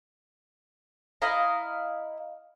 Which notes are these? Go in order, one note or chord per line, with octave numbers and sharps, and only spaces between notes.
E4 D#5 F5 A#5